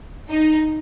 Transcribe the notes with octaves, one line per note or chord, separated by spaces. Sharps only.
D#4